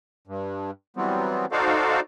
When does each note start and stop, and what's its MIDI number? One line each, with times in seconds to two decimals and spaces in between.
0.27 0.71 43
0.97 1.46 52
0.97 1.46 54
0.97 1.46 55
0.97 1.46 59
0.97 1.46 60
1.52 2.00 63
1.52 2.00 66
1.52 2.00 69
1.52 2.00 72
1.52 2.00 74
1.52 2.00 77